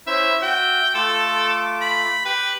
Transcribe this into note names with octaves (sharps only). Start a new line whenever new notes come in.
C#4 E4 C5 E5
F#4 E5 G5
A3 F4 A4 D6
B5
G4 B4 G5